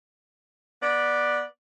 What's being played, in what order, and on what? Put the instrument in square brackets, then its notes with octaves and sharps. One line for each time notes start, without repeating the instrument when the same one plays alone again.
[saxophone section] B3 D5